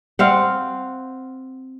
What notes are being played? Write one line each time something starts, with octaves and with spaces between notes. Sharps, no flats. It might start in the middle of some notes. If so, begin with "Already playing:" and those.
C4 F5 F#5